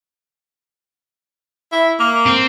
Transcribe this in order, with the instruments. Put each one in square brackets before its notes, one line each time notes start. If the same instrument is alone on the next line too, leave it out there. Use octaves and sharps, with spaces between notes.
[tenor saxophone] E4
A#3
[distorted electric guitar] C4